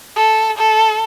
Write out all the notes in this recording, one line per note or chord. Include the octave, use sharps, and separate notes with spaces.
A4
A4